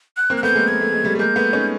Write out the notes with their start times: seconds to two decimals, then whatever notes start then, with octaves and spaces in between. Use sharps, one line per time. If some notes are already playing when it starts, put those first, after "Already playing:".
0.17 F#6
0.30 A#3 C4
0.37 F#6
0.43 A3 B3 G6
0.55 G#3 A#3
0.68 A#3 G#6
0.81 A3
0.92 G#3
1.04 G3 A3
1.15 A3
1.19 G#3 A#3 G6
1.36 A3 B3
1.53 C#4 D#4